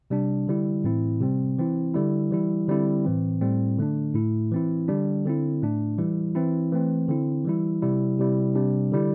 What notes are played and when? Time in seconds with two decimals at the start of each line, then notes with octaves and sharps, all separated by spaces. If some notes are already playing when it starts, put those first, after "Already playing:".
0.10 C3 G3 D4
0.47 D3 G3 E4
0.84 A2 E3 C4 E4
1.21 C3 G3 C4
1.58 E3 C4 E4
1.94 D3 G3 E4
2.31 E3 G3 E4
2.68 D3 G3 C4 E4
3.05 A2 E3 C4
3.41 A2 G3 C4 E4
3.78 D3 A3 D4
4.14 A2 A3 E4
4.51 E3 C4 E4
4.88 D3 G3 D4
5.25 D3 C4 E4
5.62 A2 A3 D4
5.98 E3 G3 E4
6.35 E3 C4 E4
6.72 E3 A3 C4
7.09 D3 C4 E4
7.45 E3 G3 E4
7.82 C3 G3 E4
8.19 C3 G3 E4
8.55 C3 G3 D4
8.92 D3 G3 E4